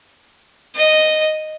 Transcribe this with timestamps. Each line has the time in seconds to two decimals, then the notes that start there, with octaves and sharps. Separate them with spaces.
0.75 D#5